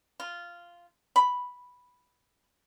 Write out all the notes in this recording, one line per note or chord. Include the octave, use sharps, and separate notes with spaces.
F4
B5